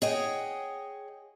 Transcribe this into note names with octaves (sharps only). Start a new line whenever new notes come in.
G#4 C#5 D#5 F#5 G5